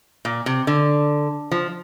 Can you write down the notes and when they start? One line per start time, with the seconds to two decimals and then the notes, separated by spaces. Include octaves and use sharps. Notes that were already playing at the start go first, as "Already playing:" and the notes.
0.25 A#2
0.46 C3
0.67 D3
1.51 F3